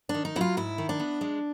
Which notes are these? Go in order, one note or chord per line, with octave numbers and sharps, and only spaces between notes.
D4
D#3
D#4
F#3 E4 F4
G#2 E4
D#3
D4
B3
G#3